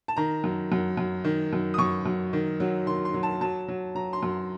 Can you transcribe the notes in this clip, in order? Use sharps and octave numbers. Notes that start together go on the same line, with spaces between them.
A5
D#3 A#5
F#2
F#2
F#2
D#3
F#2
D#6
F#2 C#6
F#2
D#3
F#3
D#3 C6
C6
F#3
A5
F#3 A5
F#3
F#3 A#5
C6
F#2